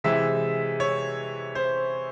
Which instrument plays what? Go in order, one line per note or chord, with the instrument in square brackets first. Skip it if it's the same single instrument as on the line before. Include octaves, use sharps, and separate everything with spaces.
[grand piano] C3 E3 G#3 E5
C#5
C5